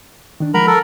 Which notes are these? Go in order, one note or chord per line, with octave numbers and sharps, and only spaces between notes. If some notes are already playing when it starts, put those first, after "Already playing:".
D#3 D4
F3 G#3 A#4 F#5 A#5 B5
A4 A#4